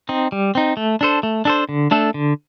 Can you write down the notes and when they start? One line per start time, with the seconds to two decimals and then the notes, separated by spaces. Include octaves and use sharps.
0.09 C4 D#4
0.32 G3
0.55 C4 D#4
0.77 A3
1.01 D4 A4 C5
1.23 A3
1.45 D4 A4 C5
1.69 D3
1.91 A3 D4 A4
2.14 D3